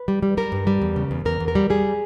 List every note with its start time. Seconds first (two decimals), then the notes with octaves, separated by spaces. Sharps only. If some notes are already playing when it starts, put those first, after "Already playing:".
Already playing: B4
0.08 G3
0.23 G3
0.37 G3 A#4
0.52 G2
0.67 G3
0.82 E2
0.96 C#3
1.11 E2
1.25 E2 A#4
1.40 E2
1.48 A#4
1.55 G3
1.70 G3 G#4